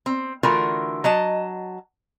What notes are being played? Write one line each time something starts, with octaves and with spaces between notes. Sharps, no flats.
C4
D3 E3 A3 F4 F#4 A#4
F#3 D#5 A5